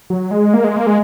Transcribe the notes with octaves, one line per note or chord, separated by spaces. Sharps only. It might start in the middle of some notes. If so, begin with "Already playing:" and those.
F#3
G#3
A#3
G#3
A#3
G#3